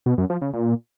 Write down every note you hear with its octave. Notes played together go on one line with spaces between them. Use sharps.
B2
F#2
F3
C#3
A#2